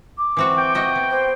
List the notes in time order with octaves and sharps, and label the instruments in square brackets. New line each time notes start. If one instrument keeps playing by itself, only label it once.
[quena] D6
[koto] E3 C4 F#4
[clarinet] G5
[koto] F#4 D#5 E5
B3
[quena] C5